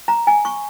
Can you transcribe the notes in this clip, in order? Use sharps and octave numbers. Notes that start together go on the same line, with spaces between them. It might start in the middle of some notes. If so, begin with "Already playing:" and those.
A#5
G#5
C#6